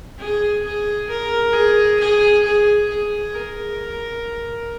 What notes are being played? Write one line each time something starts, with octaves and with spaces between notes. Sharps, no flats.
G#4
G#4
A#4
G#4
G#4
G#4
G#4
A#4